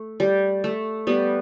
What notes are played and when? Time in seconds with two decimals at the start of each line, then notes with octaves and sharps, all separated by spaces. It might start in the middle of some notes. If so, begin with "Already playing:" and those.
Already playing: A3
0.20 G3
0.64 A3
1.07 G3 B3